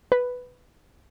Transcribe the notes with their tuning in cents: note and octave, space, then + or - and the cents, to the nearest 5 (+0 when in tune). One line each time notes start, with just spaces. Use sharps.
B4 +5